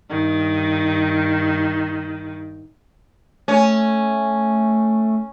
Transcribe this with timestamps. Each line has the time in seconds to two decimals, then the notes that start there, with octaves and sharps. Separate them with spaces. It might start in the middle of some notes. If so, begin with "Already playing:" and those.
0.11 G2 D#3
3.48 A3 C#4